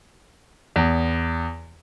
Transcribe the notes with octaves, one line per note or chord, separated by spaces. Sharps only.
E2